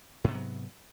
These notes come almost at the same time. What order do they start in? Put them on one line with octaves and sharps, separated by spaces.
G#2 C3 B3 F#3